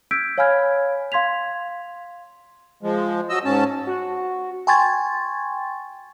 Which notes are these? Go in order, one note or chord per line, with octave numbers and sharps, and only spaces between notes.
E6 F6 G6 G#6 B6 D7
C#5 F5 G#5 B5 F6 G#6
F5 C6 G#6 B6 F7
F3 G#3
F#3 D#5 E6
G#2 C#4 A5
F#4
G5 G#5 C6 C#6 G#6 A6